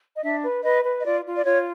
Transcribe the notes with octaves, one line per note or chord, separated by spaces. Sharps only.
D#5
D4 E5
B4
B4 D#5
B4
D#5
F4 D5
F4
D5
F4 C#5